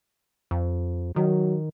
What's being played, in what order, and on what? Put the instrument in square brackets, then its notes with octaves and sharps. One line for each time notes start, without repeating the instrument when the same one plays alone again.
[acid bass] F2
[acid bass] D#3 [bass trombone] F#3